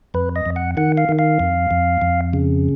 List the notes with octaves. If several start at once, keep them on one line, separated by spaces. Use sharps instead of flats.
F2 B4
D#5
F2
F#5
D#3 F#5
F5
D#3
F5
F2
F2
F2
C#3